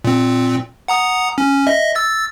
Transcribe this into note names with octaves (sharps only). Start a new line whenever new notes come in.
A#2 C4
F#5 A#5 D#6
C#4
D#5 E5
E6 A6